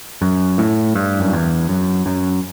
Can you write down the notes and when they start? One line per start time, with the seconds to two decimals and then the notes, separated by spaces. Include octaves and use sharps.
0.22 F#2
0.58 A2
0.95 G2
1.20 F#2
1.33 E2
1.69 F#2
2.06 F#2